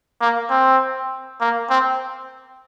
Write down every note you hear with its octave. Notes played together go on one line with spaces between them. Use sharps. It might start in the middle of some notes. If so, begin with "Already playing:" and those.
A#3
C4
A#3
C4